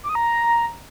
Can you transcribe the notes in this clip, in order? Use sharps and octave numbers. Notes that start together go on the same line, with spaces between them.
D6
D#6
A#5